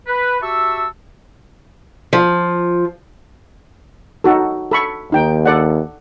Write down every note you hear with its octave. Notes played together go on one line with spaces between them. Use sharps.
B4
F#4 G4 E5 A5 C#6 E6
F3
D#4 F#4 A4
A4 B5 C#6
D#2 D#4 G5
A4 D5 F#5